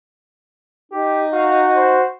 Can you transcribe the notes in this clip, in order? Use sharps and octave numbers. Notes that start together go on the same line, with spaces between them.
D#4 G4
F#4 F5
C5